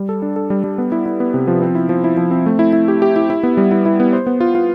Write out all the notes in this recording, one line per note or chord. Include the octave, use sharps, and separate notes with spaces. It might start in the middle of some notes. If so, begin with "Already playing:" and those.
Already playing: G3
A4
D4
A4
G3
G3
B3
E4
E4
B3
C3
F3
C4
E4
F3
E4
F3
C4
A3
E4
E4
G4
G4
E4
E4
B3
G3
E4
E4
B3
C5
B3
F4
F4